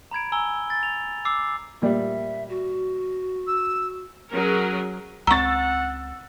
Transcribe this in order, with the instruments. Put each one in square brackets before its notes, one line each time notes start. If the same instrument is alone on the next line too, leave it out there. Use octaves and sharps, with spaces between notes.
[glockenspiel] A#5 B5 G#6 D7
G#5 A#5 E6 G7
A6
F7
D6 E6 C7
[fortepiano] A#2 G3 D5 [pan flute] E5
[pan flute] F#4
[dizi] E6
[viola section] F#3 C#4 G#4 A#4
[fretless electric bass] C#2 C4 [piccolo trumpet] F#5 [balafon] A#5 C#6 [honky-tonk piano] E6 A6